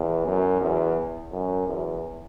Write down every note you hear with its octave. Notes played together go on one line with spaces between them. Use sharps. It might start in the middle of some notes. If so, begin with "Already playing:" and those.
Already playing: E2
F#2
E2
F#2
E2